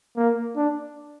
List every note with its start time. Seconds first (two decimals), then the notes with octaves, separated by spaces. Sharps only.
0.16 A#3
0.56 D4